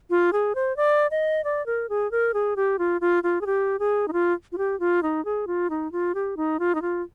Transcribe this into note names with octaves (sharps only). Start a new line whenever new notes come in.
F4
G#4
C5
D5
D#5
D5
A#4
G#4
A#4
G#4
G4
F4
F4
F4
G#4
G4
G#4
D#4
F4
F4
G4
F4
D#4
G#4
F4
D#4
F4
G4
D#4
F4
D#4
F4